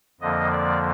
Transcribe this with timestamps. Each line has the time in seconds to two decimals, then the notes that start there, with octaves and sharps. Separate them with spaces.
0.20 F2 D3 F3 A#3 D#5
0.52 D5